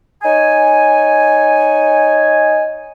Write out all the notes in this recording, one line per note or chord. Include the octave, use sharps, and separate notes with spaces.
D#4 C#5 G#5